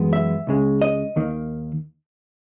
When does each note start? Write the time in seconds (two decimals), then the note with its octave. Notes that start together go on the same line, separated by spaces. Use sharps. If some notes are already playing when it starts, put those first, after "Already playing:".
Already playing: F#2 E3 G#3 B3
0.13 E5
0.47 C#2 C#3 G#3
0.82 D#5
1.16 D#2 D#3 A#3